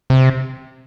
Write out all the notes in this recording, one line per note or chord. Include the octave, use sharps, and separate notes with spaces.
C3